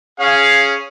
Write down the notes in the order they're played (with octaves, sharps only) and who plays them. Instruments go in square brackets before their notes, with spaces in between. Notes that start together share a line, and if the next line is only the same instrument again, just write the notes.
[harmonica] C#4 G#4 [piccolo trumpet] F5